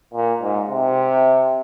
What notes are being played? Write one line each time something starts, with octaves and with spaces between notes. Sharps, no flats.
A#2
G#2
C3